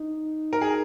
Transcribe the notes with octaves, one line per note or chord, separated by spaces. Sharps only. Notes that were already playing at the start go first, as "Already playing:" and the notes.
Already playing: D#4
A#4
G#4